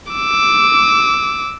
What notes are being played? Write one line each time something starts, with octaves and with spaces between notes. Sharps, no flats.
D6 E6